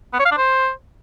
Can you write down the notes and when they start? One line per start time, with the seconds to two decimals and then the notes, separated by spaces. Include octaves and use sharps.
0.13 B3
0.19 C#5
0.25 F5
0.31 D4
0.37 C5